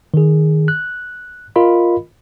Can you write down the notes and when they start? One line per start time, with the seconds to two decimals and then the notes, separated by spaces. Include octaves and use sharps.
0.14 D#3 G#4
0.68 F#6
1.56 F4 A#4 D#5 B5